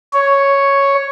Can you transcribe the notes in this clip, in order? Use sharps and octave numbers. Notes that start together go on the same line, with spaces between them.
C#5